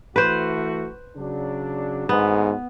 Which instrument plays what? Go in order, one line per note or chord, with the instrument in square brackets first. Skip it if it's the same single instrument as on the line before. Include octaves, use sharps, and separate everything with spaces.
[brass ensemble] E3 A3 F#4 [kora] B4 C5
[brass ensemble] C#3 F#3 D4
[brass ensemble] G#1 D2 [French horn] G#2 [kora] B3